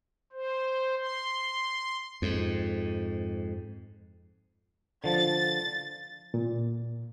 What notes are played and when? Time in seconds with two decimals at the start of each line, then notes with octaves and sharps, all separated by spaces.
0.32 C5
1.00 C6
2.22 F2 G#2
5.04 D3 F3 A5 A6
6.34 A#2